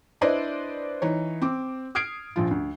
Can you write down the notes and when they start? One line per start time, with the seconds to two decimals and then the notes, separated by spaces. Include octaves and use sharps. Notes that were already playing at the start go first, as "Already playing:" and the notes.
0.21 D4 E4 B4 C5 D5 D#5
1.02 E3 D#4 C#5
1.42 C4 D6
1.95 D#6 F6 G#6 C7 D7
2.36 A#1 F3 F4
2.51 D2